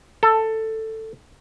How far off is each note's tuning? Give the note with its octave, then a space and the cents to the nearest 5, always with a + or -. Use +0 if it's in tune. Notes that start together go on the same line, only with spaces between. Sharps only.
A4 +10